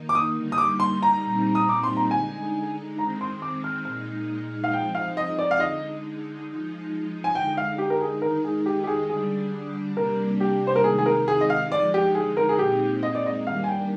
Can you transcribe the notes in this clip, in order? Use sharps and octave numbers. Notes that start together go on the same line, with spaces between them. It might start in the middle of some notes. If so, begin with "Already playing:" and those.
Already playing: D#3 A#3 D#4
D6
D#6
D3 G3 A#3 D#4
D#6
D6
C6
A#5
A#2 G3 C4 D#4
D#6
D6
C6
A#5
D3 G#3 D#4 G#5
D#3 G#3 C4 A#5
C6
D6
F6
A#2 G#3 D#4 F6
F5
F3 G#3 C4 D#4 G5
F5
D#5
D5
F5
D3 G#3 D#4 D#5
F3 G#3 D#4
G#5
D3 G#3 D#4 G5
F5
G4
A#4
G#4
D#3 G#3 D#4 A#4
G#4
G4
G4
G#4
D3 G3 D4 G#4
C3 G3 A#3 D4 A#4
G4
C5
A#4
C3 D#3 G#3 D#4 G#4
G#4
A#4
G#4
D#5
F5
D3 F3 G#3 D#4 D5
G4
G#4
A#4
G#4
A#2 G#3 C4 D#4 G4
D#5
D5
D#5
D#3 G3 A#3 D4 F5
G#5
G5